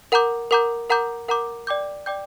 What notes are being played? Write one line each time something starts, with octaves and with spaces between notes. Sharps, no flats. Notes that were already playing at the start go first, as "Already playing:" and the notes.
A#4 F#5 A#5 D6 G6
A#4 F#5 A#5 D6 G6
A#4 F#5 A#5 D6 G6
A#4 F#5 A#5 D6 G6
D5 G5 D6 G6
D5 G5 D6 G6